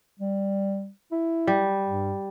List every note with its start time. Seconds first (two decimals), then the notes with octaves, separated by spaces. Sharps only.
0.19 G3
1.12 E4
1.47 G3
1.86 G2